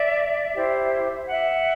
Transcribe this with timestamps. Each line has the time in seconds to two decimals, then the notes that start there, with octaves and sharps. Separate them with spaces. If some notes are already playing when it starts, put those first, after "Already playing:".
Already playing: D5 E5
0.55 E4 G4 C5
1.28 E5 F#5